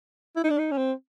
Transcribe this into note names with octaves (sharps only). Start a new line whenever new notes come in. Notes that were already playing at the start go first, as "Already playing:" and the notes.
E4
D#4
D4
D#4
C#4
C4